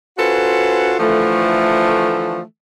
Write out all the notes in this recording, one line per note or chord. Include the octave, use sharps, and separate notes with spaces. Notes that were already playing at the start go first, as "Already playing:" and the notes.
C#4 F4 F#4 A4 B4 C5
D3 E3 F3 A3